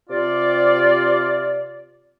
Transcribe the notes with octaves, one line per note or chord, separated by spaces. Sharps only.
C3 F4 D5